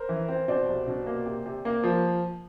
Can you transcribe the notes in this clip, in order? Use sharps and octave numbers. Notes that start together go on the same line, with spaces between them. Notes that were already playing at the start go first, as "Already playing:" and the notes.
Already playing: A#4 C5
E3
C4
B2 C5 D5
C2
B2
A#3
C3
C3
A#3
F3